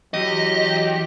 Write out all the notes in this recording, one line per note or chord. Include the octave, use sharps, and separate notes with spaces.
E2 F#3 G4 D#5